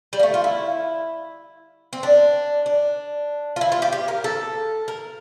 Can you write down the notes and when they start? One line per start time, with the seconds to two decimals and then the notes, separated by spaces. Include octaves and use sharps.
0.13 G3
0.19 A#3
0.23 A3
0.34 F4
0.44 E4
1.93 C4
2.03 D4
2.66 D4
3.56 F4
3.61 E4
3.72 F4
3.82 G4
3.93 G4
4.08 A#4
4.24 A4
4.88 A#4